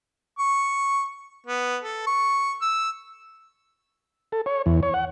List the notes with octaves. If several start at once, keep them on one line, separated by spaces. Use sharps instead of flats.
C#6
B3
A4
C#6
E6
A4
C#5
E2
C#5
F#5